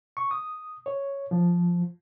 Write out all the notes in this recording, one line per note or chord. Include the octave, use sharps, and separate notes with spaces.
C#6
D#6
C#5
F3